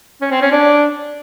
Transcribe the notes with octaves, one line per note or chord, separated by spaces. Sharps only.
C#4
C4
C#4
D4